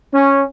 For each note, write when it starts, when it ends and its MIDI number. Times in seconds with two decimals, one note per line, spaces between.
0.14 0.44 61